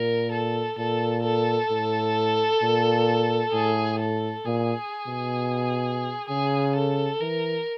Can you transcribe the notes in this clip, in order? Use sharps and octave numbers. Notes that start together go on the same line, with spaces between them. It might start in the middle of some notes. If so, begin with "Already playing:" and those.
Already playing: A#2 A#4
A4
A#2 A4
A4
A2
A#2
A2 G#4
A4
A#2 G#4
B2
C#3 G#4
A4
E3 A#4